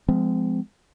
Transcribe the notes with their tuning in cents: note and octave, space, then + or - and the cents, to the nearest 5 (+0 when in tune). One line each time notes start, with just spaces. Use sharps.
F3 +0 G#3 +0 C4 -35